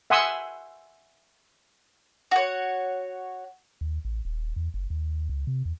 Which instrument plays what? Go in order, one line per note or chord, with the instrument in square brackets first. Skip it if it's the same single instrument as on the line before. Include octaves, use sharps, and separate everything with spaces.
[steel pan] E5 F#5 G#5 C6 D#6 E6
[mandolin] F#4 C#5
[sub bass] D#2
A1
D#1
E2
F#1
D#2
C#2
C3
E2